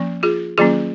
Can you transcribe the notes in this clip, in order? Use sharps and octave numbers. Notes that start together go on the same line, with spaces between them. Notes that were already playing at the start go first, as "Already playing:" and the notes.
Already playing: F3 A#3 C#4
F4 G#4
D#3 F#3 A#3 C#4 F4 G#4